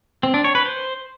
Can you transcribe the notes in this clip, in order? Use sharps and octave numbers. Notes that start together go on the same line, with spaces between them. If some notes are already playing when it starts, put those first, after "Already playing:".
C4
D4
C#5
B4
C5